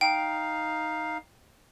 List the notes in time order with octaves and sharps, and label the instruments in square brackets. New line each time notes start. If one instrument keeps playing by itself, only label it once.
[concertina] D#4 F5 [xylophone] G5